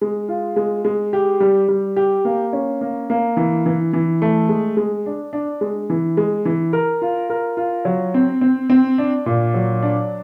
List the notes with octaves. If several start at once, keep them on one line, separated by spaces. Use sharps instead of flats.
G#3
F4
G#3
G#3
G4
G3
G3
G4
A#3
C#4
A#3
A#3
E3
E3
E3
A3
G#3
G#3
D4
D4
G#3
E3
G#3
E3
A#4
F4
A#4
F4
F#3
C4
C4
C4
D4
A#2
F#3
D4